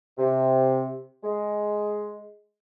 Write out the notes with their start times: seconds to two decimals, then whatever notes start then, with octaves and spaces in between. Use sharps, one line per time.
0.17 C3
1.23 G#3